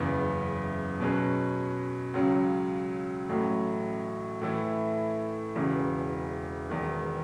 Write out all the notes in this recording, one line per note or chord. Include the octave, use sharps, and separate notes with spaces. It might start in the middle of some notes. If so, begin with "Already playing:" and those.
Already playing: F#1 E2 C#3 E3 B3
B2 F#3 C#4 G#4 B4
C#2 C#3 F#3 C#4
A1 A2 F#3 A3
A2 E3 A3 E4
E1 E2 C#3 E3
E1 E2 D#3